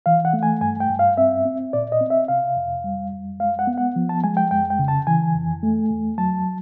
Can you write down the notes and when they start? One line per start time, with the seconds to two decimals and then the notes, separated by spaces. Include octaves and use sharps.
0.06 E3 F5
0.25 F#5
0.33 A3
0.43 G#5
0.61 G2 G#5
0.80 G5
0.89 G2
0.99 F5
1.17 C4 E5
1.45 C4
1.73 A#2 D5
1.92 D#5
2.01 C4
2.10 E5
2.28 C3 F5
2.56 F2
2.84 G3
3.12 F2
3.40 G#3 F5
3.59 F#5
3.67 B3
3.78 F#5
3.96 F3
4.09 A5
4.24 G#3 G#5
4.37 G5
4.51 F2 G5
4.70 G5
4.79 C#3
4.88 A5
5.07 E3 G#5
5.35 F2
5.63 A3
5.90 E2
6.18 F#3 A5